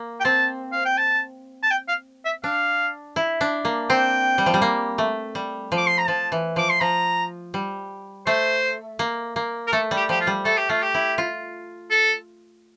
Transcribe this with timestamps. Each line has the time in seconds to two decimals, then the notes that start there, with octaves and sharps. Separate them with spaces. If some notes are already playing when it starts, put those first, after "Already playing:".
Already playing: A#3
0.20 G5
0.24 C4 A5
0.72 F5
0.85 G5
0.98 A5
1.63 A5
1.71 G5
1.88 F5
2.25 E5
2.44 D4 F5
3.16 E4
3.41 D4
3.65 A#3
3.90 C4 G5
4.38 G3
4.46 F3
4.54 G3
4.62 A#3
4.98 A3
5.35 G3
5.72 F3
5.77 D6
5.87 C6
5.98 A#5
6.07 F3 A5
6.32 E3
6.56 F3 D6
6.70 C6
6.81 F3 A#5
7.54 G3
8.27 A3 C5
8.99 A#3
9.36 A#3
9.67 A#4
9.72 A3 A4
9.91 G3
9.97 G4
10.09 F3 G4
10.21 F4
10.27 G3
10.45 A3 A4
10.57 G4
10.70 A3 F4
10.83 G4
10.94 E4
11.18 F4
11.91 A4